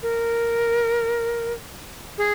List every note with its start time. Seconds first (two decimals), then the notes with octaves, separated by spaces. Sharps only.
0.03 A#4
2.18 G#4